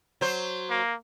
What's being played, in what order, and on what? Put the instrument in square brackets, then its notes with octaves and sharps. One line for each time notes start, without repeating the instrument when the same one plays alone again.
[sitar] F#3 C5
[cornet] A#3